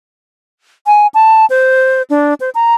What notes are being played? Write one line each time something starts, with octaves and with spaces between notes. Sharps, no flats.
G#5
A5
C5
D4
C5
A#5